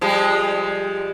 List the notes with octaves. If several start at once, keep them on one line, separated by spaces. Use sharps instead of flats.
F3 G3 G#3